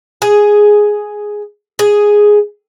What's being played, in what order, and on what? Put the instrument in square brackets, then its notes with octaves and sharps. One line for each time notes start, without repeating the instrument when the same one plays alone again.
[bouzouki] G#4
G#4